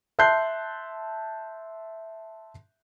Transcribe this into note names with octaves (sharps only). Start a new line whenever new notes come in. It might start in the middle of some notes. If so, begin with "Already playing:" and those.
E5 A5 C6 F#6 G6 C7